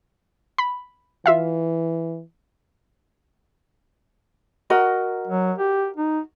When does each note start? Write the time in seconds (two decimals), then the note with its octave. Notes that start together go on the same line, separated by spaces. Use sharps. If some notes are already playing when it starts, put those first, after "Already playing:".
0.58 B5
1.26 E3 F4 E5 F5
4.70 F#4 A#4 D#5
5.27 F#3
5.58 G4
5.96 D#4